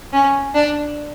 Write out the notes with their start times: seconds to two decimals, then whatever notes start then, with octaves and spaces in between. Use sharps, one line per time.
0.13 C#4
0.55 D4